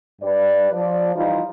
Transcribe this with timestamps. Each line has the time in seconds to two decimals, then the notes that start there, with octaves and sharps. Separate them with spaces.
0.22 G2 G3 B4 D5
0.72 F3 D5
1.16 E3 G3 D#4 F4